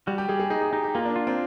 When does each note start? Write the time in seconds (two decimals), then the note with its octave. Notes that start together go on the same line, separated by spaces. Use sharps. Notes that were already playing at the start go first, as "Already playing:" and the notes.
0.07 G3 F#4
0.18 G4
0.29 G3 G#4
0.40 G#4
0.50 D#4 G#4
0.61 G#4
0.73 D#4 G4
0.83 G4
0.95 A#3 F4
1.05 D4
1.16 F4
1.27 C4